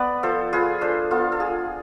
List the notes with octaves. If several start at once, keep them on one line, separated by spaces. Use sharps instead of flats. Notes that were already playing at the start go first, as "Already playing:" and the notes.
Already playing: B3 B4 D5
F3 A4 C5
F4 G#4 B4
D4 A4 C5
B3 F4 A4
A4
F4 G#4